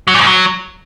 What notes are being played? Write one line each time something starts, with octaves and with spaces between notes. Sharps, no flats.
F#3
A#2
G#2
F#3